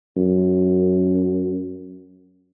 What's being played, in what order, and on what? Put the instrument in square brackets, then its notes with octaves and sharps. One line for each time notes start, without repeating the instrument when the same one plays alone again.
[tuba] F#2